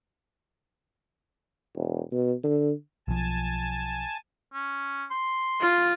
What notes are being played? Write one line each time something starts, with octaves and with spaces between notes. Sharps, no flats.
E1
B2
D3
B1 F3 G#5 A5
C#4
C6
F4